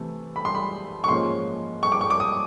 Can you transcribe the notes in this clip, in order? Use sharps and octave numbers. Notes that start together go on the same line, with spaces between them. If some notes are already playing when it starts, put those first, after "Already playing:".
Already playing: C3 E3 A3
B5
C6
B5
C#6
G#2 F3 A#3 C#4 C6
C#6
D6
C#6
D6
D#6